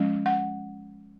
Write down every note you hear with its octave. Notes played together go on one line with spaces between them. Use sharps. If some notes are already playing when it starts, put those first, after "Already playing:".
Already playing: F3 G#3 C#4
F#5